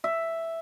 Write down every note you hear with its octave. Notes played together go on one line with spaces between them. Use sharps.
E5